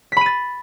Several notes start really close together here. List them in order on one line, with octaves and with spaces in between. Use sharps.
B6 B5 D#7 A6